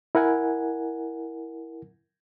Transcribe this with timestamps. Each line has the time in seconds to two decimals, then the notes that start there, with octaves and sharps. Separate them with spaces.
0.15 E4 A#4 F#5 G#5